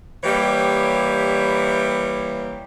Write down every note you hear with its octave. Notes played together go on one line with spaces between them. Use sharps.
E3 G3 A#3 G4 C#5